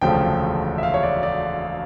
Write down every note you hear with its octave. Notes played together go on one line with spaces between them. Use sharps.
E1 D2 C#3 F3 A3 G5
E5
F5
C#5
D5
D5